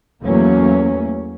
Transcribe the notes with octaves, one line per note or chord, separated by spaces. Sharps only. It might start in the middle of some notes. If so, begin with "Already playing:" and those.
E2 F#3 A3 A#3 C#4